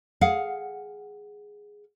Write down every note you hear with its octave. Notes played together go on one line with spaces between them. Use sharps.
G#4 F5 F#5